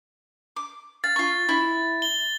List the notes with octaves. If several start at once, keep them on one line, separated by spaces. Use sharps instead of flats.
D6
F5 A6
F4 C#6
E4
G7